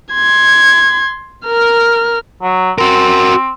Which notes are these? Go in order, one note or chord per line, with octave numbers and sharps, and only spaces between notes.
C6 G#6
A#4 F6
F#3
C4 F#4 A#4